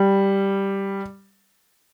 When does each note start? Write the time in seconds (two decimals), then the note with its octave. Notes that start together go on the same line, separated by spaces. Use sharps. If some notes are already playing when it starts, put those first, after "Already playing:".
Already playing: G3